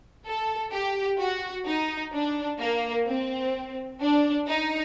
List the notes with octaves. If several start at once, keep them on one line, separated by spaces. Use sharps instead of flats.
A4
G4
F#4
D#4
D4
A#3
C4
D4
D#4